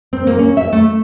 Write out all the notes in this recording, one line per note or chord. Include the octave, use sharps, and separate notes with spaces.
C4
A#3
C#4
E5
A3